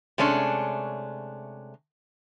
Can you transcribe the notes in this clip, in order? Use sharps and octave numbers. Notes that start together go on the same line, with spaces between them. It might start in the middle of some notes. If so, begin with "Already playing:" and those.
C3 G#3 A3 C#4 D4